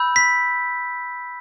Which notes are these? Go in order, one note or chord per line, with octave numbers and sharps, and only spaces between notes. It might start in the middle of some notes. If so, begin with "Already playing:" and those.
Already playing: B5 E6 G6
B6